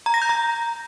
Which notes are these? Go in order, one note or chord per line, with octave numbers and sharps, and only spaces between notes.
A#5
A#6
G6
A#5